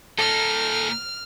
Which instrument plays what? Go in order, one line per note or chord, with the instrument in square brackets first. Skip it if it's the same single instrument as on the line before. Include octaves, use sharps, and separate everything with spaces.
[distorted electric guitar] A#2 D#4 [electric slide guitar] A4 [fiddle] F6